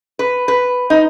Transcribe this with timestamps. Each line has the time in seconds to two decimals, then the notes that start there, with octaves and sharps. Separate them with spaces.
0.19 B4
0.48 B4
0.90 D#4